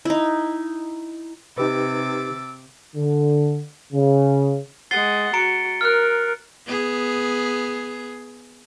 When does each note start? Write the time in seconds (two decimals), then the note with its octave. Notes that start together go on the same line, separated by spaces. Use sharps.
0.05 D#4 E4
1.58 C3 D#4 G4 B4 D6 E6 A6
2.95 D3
3.93 C#3
4.91 G#3 F#5 A6 C7 G7
5.34 F#4 A#5 C#7 D7
5.81 A#4 F6 F#6
6.66 B3 G#4